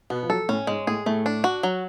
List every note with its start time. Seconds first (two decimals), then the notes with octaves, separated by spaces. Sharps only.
0.10 B2 B3
0.23 F3
0.30 F#3 A4
0.49 A2 C#4
0.67 G#2 G#3
0.87 A2 G#4
1.06 A2 A3
1.26 D4
1.44 F#4
1.63 F#3